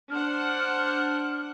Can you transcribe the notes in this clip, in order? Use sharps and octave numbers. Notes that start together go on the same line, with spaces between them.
D4 C5 F#5 F6